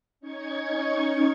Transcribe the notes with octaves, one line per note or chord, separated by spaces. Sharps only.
C#4 D#4 C#6 G#6